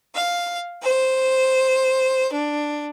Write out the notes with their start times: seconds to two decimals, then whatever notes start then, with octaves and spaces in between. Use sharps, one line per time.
0.15 F5
0.83 C5
2.32 D4